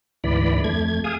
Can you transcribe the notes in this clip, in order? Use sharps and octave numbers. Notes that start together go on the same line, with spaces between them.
D2 G#2 E3 D5 B5
F2 A3 G#6
G#4 F5 G#5 D#6